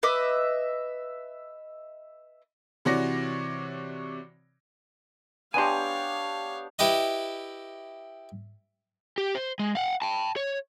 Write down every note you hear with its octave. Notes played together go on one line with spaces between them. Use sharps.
B4 D#5 E5 D6
C3 E3 F#4 C#5 D5 A#6
B3 D4 G4 C#5 F5 G#5 C6
E4 G4 B4 D#5
G4
C5
G#3
F5 F#5
G5 A5
C#5